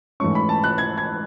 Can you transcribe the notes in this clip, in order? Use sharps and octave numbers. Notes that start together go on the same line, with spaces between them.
G#2 E3 A3 C#4 C#6
B5
A5
F#6
G#6
G#6